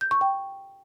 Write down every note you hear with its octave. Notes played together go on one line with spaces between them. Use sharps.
G6
C#6
G5